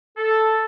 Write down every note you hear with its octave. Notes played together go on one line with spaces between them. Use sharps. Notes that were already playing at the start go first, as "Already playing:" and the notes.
A4